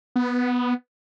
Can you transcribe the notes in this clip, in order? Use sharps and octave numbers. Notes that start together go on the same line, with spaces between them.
B3